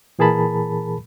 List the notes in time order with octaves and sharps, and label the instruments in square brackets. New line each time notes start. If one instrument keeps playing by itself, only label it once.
[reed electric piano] A#2 E3 G#4 A#4 A5 B5